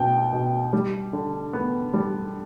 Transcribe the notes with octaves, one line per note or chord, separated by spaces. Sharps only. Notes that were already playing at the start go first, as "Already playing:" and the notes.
Already playing: B2 G5
B2
G3
D3
B3
G3